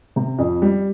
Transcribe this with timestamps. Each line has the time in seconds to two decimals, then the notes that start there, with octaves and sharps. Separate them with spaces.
0.16 C3
0.39 F2
0.62 G3